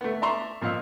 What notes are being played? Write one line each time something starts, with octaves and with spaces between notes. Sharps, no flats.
A3 B3
D5 E5 A#5 C6 C#6
A#2 F3 D#5 F5 E6